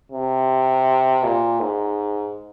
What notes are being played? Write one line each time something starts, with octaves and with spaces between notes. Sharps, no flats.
C3
A#2
G#2